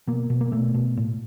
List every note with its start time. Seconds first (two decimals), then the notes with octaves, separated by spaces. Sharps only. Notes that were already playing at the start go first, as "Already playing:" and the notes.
0.07 B2 A#3
0.30 B2
0.41 A#3
0.52 B2 A3
0.74 B2
0.97 A2